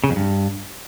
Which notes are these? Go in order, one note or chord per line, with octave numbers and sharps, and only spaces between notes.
C#3
F2
G2